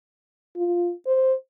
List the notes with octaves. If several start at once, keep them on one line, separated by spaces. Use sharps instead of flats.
F4
C5